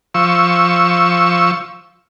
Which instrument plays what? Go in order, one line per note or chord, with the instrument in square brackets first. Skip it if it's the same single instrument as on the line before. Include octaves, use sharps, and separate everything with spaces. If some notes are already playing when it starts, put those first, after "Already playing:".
[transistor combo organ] F3 C#6 E6